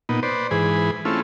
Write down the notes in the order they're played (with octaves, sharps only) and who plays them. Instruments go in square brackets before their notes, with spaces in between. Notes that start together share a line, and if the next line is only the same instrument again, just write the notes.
[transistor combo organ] A#2 B3 D#4
B4 C5 D5
G#2 E3 G#4 B5
A3 C4 C#4 E4 F4